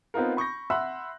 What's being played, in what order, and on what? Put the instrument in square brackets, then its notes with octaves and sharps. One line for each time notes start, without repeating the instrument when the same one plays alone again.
[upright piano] B3 C4 D#4 F4 A#4
B5 C#6 G6 A#6
E5 F#5 B5 C6 E6 F#6